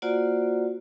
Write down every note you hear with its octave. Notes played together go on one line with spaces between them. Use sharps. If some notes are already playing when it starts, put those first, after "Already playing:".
A#3 F4 F#4 C5 D5 F#5